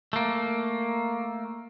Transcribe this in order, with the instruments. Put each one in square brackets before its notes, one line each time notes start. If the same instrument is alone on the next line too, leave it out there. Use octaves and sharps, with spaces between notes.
[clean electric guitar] A3 A#3